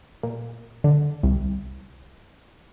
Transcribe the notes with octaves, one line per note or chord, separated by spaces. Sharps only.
A#2
D3
C2